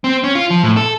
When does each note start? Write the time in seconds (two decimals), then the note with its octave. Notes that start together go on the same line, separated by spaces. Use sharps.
0.04 C4
0.24 C#4
0.35 F4
0.50 F3
0.63 A2
0.77 A4